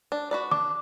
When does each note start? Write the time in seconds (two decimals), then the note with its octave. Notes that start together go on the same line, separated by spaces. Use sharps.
0.12 D4
0.31 F#4 B4 D5
0.51 D4 D6